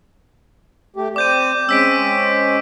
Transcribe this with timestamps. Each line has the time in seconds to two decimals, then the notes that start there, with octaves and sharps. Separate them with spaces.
0.96 A3 G4
1.16 C4 D5 D6 G6 D#7
1.69 G#3 C4 C#4 E6 B6 D7